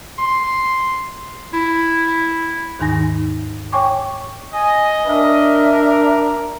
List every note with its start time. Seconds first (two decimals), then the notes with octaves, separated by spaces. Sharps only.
0.18 C6
1.53 E4
2.79 D#2 G#2 D#3 D#4 G#5 A#6
3.72 C#5 G5 G#5 C#6 D6
4.53 D#5 G#5
5.07 D4 A#4 E5